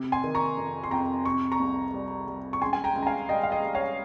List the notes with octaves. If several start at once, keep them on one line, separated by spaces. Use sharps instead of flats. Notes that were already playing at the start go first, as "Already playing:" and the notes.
Already playing: C3
G#5 C6
D#3
A#5 C#6
F2
C6
F2 G5 A#5
C3 C#6
A#5 C#6
C2
G3
G3
C#6
C#2 G#5 C6
G#5
G5 A#5
C#2
A#5
F5 G#5
G3 D#5 G5
F5
D#5 G5
G3
C#5 F5